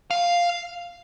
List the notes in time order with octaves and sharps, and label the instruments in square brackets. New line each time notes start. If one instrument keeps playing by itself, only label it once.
[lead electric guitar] F5